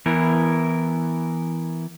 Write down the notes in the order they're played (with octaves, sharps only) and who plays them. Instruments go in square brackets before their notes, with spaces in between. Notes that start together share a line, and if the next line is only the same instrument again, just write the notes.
[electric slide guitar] E3 B3 E4 A#4